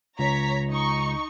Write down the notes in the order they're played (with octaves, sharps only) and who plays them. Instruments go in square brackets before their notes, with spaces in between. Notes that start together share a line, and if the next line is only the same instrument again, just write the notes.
[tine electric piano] C#2 [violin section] C#5 A#5 B6
[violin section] D#4 C#6